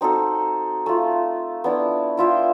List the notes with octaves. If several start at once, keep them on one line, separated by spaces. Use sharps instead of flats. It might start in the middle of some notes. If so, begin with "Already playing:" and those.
C4 D#4 F#4 A4
A3 F4
B3 D4 E4
E4 F4 E5 G5